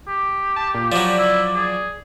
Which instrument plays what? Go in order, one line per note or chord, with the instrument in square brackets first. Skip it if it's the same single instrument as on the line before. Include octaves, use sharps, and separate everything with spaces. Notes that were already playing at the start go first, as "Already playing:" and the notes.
[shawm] G4
[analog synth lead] A5
A#2
[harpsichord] F3 F#3 [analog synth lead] D5
[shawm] E4
G#4